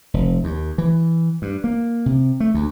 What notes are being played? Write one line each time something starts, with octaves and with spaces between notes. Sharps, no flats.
F1
D#2
E3
G2
A#3
C3
A3
D2